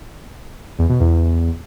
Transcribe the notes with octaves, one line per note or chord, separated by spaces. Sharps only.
E2
B2
E2